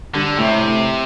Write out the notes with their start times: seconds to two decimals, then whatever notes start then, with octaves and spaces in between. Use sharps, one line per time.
0.15 G2 D3
0.38 A2 C3